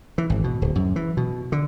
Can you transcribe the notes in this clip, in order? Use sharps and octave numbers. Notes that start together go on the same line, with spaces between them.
E3
G#1
B2
D1
F#2
E3
B2
D3